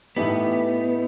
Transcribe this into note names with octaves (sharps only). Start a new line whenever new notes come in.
A2 E3 A3 B3 D#4 G4